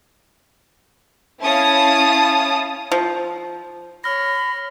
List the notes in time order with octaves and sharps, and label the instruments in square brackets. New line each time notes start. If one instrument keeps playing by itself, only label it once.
[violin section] C#4 E4 F5 A5 D#6
[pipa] F3
[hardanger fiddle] C#5 [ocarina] B5 [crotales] F6 A#6